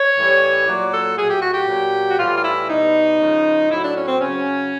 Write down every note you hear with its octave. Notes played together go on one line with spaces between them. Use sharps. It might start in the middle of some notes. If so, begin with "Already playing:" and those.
Already playing: C#5
A2 E3 G3
A#2 F#3 D5
A4
A2 F#3 G#4
G4
F#4
G4
A#2 F#3
F#4
A2 E3 G3 F4
F4
E4
B2 G3 D#4
C#3 F3
A2 F#3 E4
D4
C#4
C4
C#3 F#3 C#4